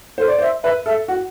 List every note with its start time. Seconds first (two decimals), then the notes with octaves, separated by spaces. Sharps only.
0.18 A4 C5
0.28 D5
0.38 C5
0.41 E5
0.63 B4 E5
0.86 A4 E5
1.08 F#4 F#5